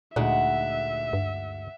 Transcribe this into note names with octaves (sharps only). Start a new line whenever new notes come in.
D2 A#2 G#3 D#4 E5 F#5
G2